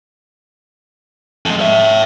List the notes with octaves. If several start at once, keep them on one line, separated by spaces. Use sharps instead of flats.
F2 G#3
C#5 E5